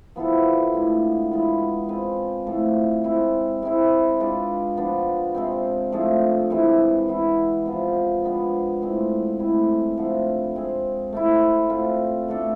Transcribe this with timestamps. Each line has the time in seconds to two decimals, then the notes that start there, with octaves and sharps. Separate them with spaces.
0.16 F3 B3 E4 A4
0.73 A2 G#3 D4
1.31 E3 G#3 B3 F4
1.89 G#3 C4 F4 B4
2.47 A2 F3 A3
3.04 G#3 C4 E4
3.62 C3 G#3 C4 E4
4.20 G#3 D4 F4 B4
4.77 F3 B3 D4
5.35 C3 G#3 C4
5.92 F3 A3 D4 G#4
6.50 C3 E3 G#3
7.08 E3 B3 E4
7.66 C3 F3 B3 F4
8.24 F3 G#3 B3 D4
8.82 A2 G#3 C4
9.39 A2 G#3 C4 E4
9.97 D3 F3 A3
10.55 G#3 C4 G#4
11.13 A3 C4 E4
11.70 A3 C4 F4
12.28 B2 A3 D4 A4